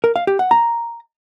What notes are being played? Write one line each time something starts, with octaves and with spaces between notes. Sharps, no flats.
A#4
F5
G4
F#5
A#5